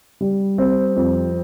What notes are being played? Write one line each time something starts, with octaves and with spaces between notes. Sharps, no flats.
G3
C4
F2